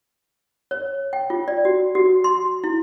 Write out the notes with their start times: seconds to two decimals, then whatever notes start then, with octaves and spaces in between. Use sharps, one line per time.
0.71 C#5
1.13 G5
1.30 F4
1.48 D5
1.65 F#4
1.95 F#4
2.24 C6
2.64 E4